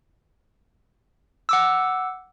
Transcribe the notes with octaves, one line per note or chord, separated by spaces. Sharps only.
F#5 D6 E6